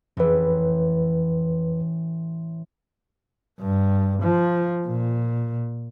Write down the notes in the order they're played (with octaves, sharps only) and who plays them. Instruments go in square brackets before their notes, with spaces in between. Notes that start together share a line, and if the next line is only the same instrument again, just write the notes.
[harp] A1 E3 [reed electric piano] F2 B4
[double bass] G2
F3
A#2